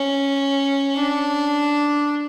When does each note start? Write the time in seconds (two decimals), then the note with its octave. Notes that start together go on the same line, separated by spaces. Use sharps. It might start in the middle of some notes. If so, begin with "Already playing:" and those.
Already playing: C#4
0.96 D4